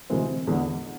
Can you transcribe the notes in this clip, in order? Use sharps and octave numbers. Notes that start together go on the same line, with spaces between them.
D2 C3 E3 G#3 C4
E2 D3 G#3 B3